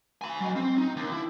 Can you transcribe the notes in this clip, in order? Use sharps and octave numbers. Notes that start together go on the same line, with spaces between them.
G#5 B5
F#3 D#5
C4
D#4
D#2
E4